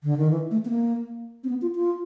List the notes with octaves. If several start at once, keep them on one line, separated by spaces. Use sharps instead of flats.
D3
D#3
E3
A3
B3
A#3
C4
B3
F4
F4